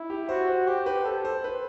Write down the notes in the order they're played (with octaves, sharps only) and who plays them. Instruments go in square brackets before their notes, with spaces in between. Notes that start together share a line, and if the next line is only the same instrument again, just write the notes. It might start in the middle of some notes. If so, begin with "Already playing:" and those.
Already playing: [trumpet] E4
[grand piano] G4
[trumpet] F#4 [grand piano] C5
[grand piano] C5
[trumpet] G4 [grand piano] C5
[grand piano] B4
[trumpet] A4 [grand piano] C5
[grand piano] C5
B4